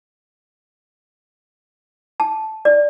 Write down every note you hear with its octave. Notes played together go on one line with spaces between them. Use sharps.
A5
D5